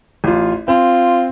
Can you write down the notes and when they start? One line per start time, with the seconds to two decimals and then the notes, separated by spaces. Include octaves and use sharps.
0.24 A1 F4
0.68 C4 F4